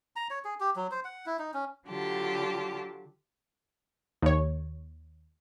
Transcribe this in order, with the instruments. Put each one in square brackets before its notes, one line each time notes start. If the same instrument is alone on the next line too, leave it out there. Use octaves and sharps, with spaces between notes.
[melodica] A#5
C#5
G#4
G4
F#3
C5
F#5
E4
D#4
C#4
[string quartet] D3 F#3 F4 G4 A5
[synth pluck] D#2 C#5